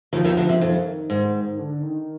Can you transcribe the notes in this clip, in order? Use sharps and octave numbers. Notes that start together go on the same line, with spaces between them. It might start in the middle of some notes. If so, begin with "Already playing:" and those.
D#2 D#3 F3
D#2 D#3
D2 D3
C3
F2 D#3
G#2
D3
D#3